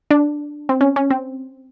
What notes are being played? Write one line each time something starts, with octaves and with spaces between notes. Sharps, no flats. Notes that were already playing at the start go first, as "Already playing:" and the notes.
D4
C4
C#4
C#4
C4